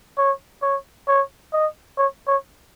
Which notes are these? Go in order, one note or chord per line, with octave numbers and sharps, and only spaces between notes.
C#5
C#5
C#5
D#5
C#5
C#5